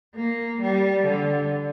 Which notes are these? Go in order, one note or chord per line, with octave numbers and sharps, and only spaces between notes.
A#3
G3
D3